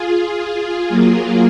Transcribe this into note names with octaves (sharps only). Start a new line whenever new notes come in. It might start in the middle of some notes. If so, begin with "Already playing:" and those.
Already playing: F4 G#4
F#3 A#3